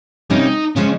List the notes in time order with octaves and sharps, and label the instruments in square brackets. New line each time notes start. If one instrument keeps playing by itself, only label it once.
[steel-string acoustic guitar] C3 G3 A#3 C#4 [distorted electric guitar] D#4
[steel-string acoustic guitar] C#3 F3 G#3 [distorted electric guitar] C#4